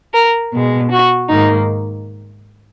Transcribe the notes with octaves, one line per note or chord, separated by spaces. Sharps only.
A#4
B2 G#3
F#4
G#2 D#3 A#3 D#4